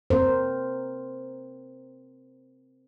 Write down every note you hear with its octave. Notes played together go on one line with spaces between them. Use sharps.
C4 A#4 C5